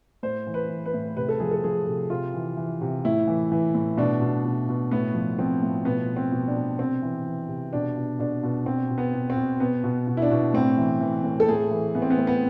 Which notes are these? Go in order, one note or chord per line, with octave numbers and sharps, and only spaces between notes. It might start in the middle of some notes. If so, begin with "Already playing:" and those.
A2 C5
E3
B4
E3
B4
A2
C3 B4
A4
F3 G#4
A4
F3 G#4
C3
C3 F4
E3
E3
C3
A2 E4
E3
E3
A2
B2 D4
B2
B2
B2
A2 B3
F3
F3 C4
A2
B2 B3
B2
C4
B2
D4
B2
C3 C4
E3
E3
C3
B2 D4
B2
B2 D4
B2
B2 C4
B2
B3
B2
C4
B2
B2 B3
B2
B2
E4
D4
B2
A2 C4
E3
E3
A2
A4
A2 G#4
E3
E3 B3
C4
B3
A2 C4
B3